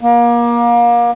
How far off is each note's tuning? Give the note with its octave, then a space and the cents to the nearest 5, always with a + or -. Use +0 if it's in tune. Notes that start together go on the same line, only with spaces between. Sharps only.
A#3 +30